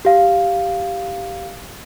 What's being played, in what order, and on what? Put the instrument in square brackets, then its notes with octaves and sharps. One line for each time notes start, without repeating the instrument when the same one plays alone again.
[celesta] G4 F5